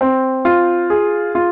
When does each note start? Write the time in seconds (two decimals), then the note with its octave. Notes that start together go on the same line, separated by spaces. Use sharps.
0.01 C4
0.45 F4
0.90 G#4
1.35 F4